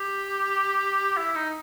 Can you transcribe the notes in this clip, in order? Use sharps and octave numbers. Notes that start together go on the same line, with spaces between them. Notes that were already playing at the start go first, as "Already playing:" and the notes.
Already playing: G4
E4
D#4